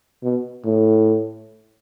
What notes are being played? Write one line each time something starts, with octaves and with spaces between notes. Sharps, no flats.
B2
A2